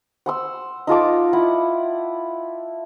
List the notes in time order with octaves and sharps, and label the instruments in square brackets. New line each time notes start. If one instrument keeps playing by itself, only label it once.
[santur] F#5 C6 E6
D#4 F4 A4 D6
E4 F#5